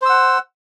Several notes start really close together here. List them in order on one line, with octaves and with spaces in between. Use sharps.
C5 E6 F#5